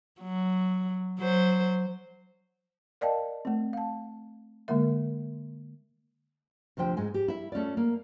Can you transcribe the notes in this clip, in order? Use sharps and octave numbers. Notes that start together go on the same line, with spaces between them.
F#3
F#3 C5
A#4 D5 D#5 F5 G5 A5
A3 C4
F5 A5
D3 G#3 A#3 A#4 E5
D2 C3 F3 C5 G5
G#2 G#3 G#5
G4
E4 E5
A3 C#4 F4 D5
A#3